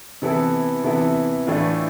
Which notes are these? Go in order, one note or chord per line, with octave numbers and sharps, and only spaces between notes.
C3 E3 B3 E4 A4
C3 E3 B3 E4 A4
A2 E3 A3 D4 F4